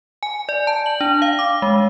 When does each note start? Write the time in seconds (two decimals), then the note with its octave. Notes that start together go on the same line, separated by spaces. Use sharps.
0.23 G#5
0.49 D5
0.67 A5
0.86 F#7
1.01 D4
1.22 F5
1.39 D6
1.62 G#3